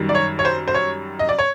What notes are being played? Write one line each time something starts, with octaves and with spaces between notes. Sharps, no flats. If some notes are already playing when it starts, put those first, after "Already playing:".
Already playing: F#2 D#3 G3
D5
C#5
C#5
C5
C5
C#5
D#5
D5
C#5